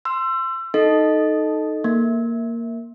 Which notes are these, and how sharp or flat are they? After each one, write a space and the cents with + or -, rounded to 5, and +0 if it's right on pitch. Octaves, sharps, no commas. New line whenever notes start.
C6 +0 E6 +30
D#4 +0 A4 -10 D#5 +0
A#3 -5 E5 +0